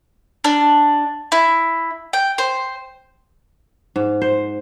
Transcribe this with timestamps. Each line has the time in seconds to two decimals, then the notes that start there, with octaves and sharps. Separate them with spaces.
0.44 D4
1.32 E4
2.13 G5
2.38 C5
3.96 G#2
4.22 C5